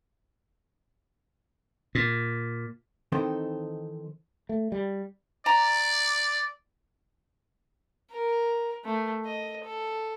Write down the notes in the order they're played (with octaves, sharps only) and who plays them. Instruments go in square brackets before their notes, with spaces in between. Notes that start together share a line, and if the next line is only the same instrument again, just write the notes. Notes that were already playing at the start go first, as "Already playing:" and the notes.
[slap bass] A#2
[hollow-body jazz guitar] D#3 E3 C4 D#4 A4 C5
[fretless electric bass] A3
G3
[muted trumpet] D5 [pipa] A#5
[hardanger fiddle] A#4
A3
D#5
A4